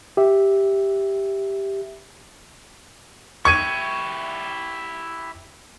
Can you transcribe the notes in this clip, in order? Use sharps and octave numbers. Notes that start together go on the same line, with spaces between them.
G4 E5
E4 G4 C#6 G#6 D#7